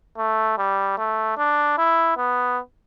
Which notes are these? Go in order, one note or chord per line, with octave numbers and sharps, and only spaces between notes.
A3
G3
A3
D4
E4
B3